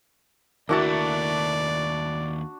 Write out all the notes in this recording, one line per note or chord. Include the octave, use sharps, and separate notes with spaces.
D#2 A3 A#3 D4 E4 F#4 D5 A5